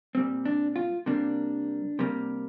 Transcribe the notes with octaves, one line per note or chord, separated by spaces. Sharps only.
A#2 G3 C4
D4
F4
C3 G3 A#3 D4
C3 G3 A#3